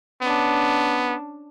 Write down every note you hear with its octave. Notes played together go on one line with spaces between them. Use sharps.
B3 C#4 D4